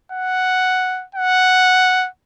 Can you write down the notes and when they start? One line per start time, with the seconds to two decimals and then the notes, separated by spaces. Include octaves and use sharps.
0.12 F#5
1.15 F#5